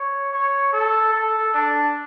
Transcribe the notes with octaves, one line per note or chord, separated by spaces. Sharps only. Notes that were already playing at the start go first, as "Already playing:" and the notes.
Already playing: C#5
C#5
A4
A4
D4